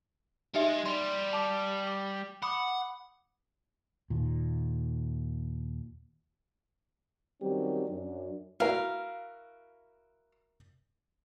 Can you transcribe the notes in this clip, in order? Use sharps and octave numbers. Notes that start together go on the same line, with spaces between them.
G#3 D#4 G4 E5
G3 C6
A5 D6
D6
F#5 B5 D6 D#6
D#2 A#2
D#3 F#3 G3 C4 C#4 G4
F#2 F#3 D4
E4 F#4 A#4 F5